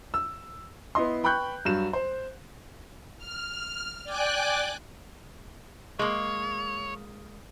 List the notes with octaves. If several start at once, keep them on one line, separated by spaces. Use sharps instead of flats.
E6
B3 E4 D#5 C6
B4 G5 B5 C#6 F#6 G6
G2 F#3 E7
C5
F6
D5 G5 G#5 D6 F#6
G#3 A#3 C#5